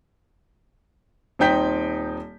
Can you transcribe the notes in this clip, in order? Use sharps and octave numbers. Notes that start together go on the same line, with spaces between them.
D#1 C4 D#4 G5 G6 B6